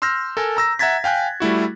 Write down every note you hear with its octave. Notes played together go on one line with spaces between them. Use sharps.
C6 E6 F6 G6 A#6
A4 A#4 G#5 A5
A#5 E6 A#6
E5 F#5 A#5 G#6 A6 B6
F5 G5 G#5 F#6
G3 A3 E4 F#4